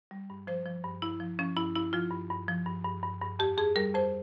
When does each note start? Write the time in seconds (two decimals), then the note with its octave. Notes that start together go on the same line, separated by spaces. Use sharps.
0.11 G3
0.30 G2
0.47 F3 C5
0.66 F3
0.84 G2
1.02 G2 E4
1.20 F3
1.39 F3 C#4
1.56 G2 E4
1.76 G2 E4
1.93 F3 F4
2.11 G2
2.30 G2
2.48 F3
2.66 G2
2.85 G2
3.03 G2
3.22 G2
3.39 F2 G4
3.58 F2 G#4
3.76 G3 A#4
3.94 F2 C5